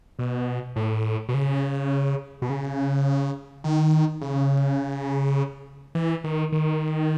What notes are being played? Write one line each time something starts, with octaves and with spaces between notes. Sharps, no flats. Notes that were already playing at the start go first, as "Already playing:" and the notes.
B2
A2
B2
C#3
B2
C#3
D#3
C#3
E3
D#3
D#3